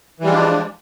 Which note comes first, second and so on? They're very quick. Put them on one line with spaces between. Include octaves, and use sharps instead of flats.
E3 G3 G#3 F3 D4